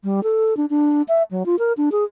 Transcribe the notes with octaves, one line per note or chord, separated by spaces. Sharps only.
G3
A4
D4
D4
E5
F#3
F4
A#4
D4
G#4